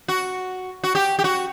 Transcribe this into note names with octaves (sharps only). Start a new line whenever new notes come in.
F#4
F#4
G4
G4
F#4